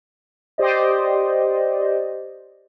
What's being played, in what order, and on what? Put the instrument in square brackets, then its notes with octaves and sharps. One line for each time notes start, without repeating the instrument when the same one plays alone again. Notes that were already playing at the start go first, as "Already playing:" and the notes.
[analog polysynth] G4 C5 D5 D#5